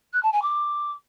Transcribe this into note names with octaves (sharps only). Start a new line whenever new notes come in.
F#6
A5
G#5
D6